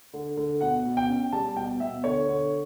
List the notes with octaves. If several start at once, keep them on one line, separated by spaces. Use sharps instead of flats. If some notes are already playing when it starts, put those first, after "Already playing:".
D3
D3
B2 F#5
B2
G5
C#4
G3 A5
B2 G5
B2 E5
D3 C#5
D3